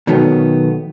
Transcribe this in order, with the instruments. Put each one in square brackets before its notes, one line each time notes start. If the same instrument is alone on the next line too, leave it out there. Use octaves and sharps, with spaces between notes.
[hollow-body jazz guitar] B2 D#3 F#3 A3 B3